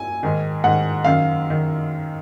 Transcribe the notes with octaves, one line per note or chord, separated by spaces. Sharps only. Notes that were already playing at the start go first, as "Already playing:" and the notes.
Already playing: G#5
G#2 D#3
G#2 D#3 F#5
F#2 D#3 F5
D#3